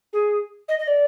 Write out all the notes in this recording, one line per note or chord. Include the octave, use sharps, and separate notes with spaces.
G#4
D#5
D#5
D5